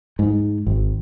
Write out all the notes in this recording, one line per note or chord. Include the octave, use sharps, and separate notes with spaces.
G#2
G#1